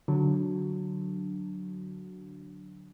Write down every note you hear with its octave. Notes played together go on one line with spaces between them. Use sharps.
D3 F#3